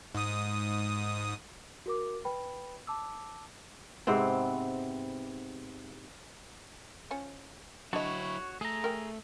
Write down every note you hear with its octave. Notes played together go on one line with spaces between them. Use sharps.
G#2 D#6
F#4 A#4 D6
B4 G5 B5
A5 D6 E6
G#2 C3 B3 C4
F3 C#4
F#3 D4 E4 F#4 C#5 D#5
A3 G#4 A#5
A#4 G5